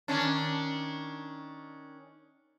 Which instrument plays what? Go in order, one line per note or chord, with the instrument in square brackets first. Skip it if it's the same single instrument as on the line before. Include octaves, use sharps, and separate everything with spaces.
[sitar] D#3 C#4 D4